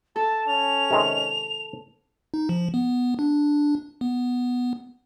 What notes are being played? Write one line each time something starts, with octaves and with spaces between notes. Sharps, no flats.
A4 A5
C#4 F7
C3 D#3 G#3
D#4
F3
B3
D4
B3